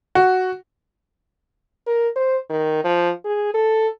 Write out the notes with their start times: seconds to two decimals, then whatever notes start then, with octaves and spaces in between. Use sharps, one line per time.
0.15 F#4
1.87 A#4
2.16 C5
2.50 D#3
2.84 F3
3.24 G#4
3.54 A4